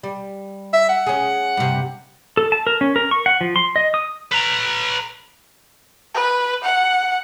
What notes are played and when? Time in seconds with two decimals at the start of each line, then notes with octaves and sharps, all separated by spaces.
0.03 G3
0.73 E5
0.89 F#5
1.06 C#4 G#4
1.57 G2 C3
2.37 A4
2.52 A5
2.67 A#4
2.81 C#4
2.96 A#4
3.11 C#6
3.26 F#5
3.41 F3
3.56 C6
3.76 D#5
3.94 D#6
4.32 B4 A#5
6.14 B4
6.64 F#5